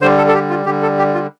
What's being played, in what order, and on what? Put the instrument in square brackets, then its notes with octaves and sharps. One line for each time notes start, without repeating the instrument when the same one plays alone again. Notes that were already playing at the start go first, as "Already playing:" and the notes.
[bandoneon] D3 G3 C5
A4
A4
G4
F4
D3 G3 G4
A4
G4
F4